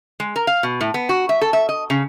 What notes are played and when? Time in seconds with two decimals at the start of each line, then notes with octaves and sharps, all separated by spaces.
0.20 G#3
0.36 A#4
0.47 F5
0.63 B2
0.81 A2
0.94 B3
1.09 F#4
1.29 E5
1.42 A4
1.53 E5
1.69 D#5
1.90 C#3